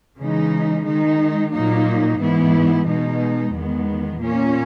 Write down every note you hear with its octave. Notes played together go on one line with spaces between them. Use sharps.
C#3 E3 G#3 D#4
D#3 G#3 D#4
A#2 F#3 A#3 D#4
G#2 E3 B3 E4
B2 G#3 D#4
E2 D#3 G#3 B3
A#2 A#3 C#4